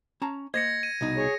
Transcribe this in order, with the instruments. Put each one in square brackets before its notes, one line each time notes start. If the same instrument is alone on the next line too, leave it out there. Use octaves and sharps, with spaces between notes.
[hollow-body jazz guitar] C#4 A5 A#5
[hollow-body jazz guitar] A#3 C5 D#5 [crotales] G#6 A#6 C#7
[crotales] D#7
[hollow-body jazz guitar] C2 B2 D#4
[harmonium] G#4 C#5